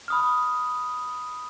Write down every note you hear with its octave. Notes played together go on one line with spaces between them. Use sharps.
B5 D#6 F6